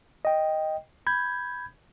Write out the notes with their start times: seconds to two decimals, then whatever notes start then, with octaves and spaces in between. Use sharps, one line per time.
0.25 D#5 G5
1.07 B5 G6 G#6